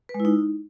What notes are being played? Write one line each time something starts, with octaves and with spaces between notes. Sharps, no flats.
B4
G#3
E4
D#4